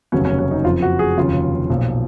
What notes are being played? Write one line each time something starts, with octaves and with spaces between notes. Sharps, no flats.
F1 D#2 C#3 F#3 C#4
C#4
C#4
D#4
F#1 F2 F3 F4
F#4
G#4
F1 D#2 C#3 F#3 F4
B1 A#2 F3